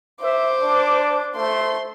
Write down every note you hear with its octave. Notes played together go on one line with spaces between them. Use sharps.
C5 E5 D6
D4
A3 C5 C6